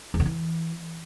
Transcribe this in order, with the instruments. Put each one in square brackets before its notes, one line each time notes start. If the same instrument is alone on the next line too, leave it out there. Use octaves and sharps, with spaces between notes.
[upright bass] E2
D3
E3